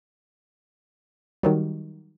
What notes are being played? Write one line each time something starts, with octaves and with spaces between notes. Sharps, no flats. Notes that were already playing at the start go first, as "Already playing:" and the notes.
D#3 F#3 G3